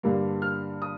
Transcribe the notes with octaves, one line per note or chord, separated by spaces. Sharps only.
G2 D3 G3 A#3
F6
D#6